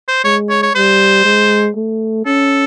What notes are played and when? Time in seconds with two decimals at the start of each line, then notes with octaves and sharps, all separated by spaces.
0.08 C5
0.24 G#3 C#5
0.50 C#5
0.63 C#5
0.75 G3 C5
1.25 G#3
1.76 A3
2.25 C#4 A4